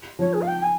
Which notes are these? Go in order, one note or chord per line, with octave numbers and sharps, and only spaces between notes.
F3 C#5
G#4
F5
G5
G#5